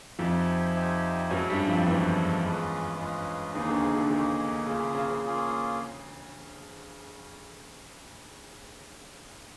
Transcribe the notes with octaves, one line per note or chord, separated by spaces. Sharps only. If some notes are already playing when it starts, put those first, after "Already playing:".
F2 F3 D#4 G4 C5 E5 G#5
D#4 G4 C5 E5 G#5
F#2 F#3 G#3 C#4 E4 A4
G2 G3
F2 F3
E2 E3 G#3 C#4 E4 A4
G#3 C#4 F4 G#4 B4
G#3 C#4 F4 G#4 B4
D#2 D#3 A#3 D#4 G#4
D2 D3
C#3
D2 D3
D2 D3 A#3 D#4 G#4
C#3 A#3 C#4 F4 G#4
C#3
C#3
C#3
A#3 C#4 F4 G#4